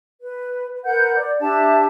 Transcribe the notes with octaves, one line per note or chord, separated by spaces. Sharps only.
B4
A#4 B4 F#5 G6
D5
D4 G4 E5 A5